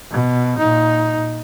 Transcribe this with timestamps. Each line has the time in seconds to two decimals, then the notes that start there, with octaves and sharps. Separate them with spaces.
0.11 B2
0.58 A#2 D#4